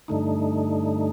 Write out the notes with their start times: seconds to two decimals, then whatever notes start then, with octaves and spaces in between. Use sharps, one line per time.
0.08 G2 D3 A3 D#4